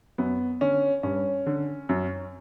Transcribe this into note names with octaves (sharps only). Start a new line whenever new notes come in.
F#2 B3
D3 C#4
G2 C#4
D3
F#2